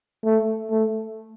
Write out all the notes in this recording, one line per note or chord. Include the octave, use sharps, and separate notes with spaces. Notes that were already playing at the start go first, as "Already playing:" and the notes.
A3
A3